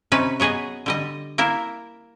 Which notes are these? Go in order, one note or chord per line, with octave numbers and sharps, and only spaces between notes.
C3 C#4 D#4 B4
F#3 B3 G#4 B4 D#5
D3 G3 D#5
A#3 E4 A#4